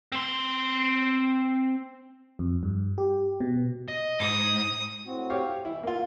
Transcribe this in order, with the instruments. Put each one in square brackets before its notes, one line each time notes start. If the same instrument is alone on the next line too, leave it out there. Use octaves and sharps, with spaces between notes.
[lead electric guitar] C4 C6
[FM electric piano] F2
G2
G4
B2
[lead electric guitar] D#5
[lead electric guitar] G#2 [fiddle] D#6
[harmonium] A2 C4 F#4
[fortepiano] G4 C#5 F5
[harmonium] B2 E3 [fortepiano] E4
[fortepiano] A#3 F4 [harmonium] F5